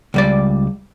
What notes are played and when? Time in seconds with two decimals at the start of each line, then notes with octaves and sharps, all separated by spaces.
0.14 C#2 G3 D5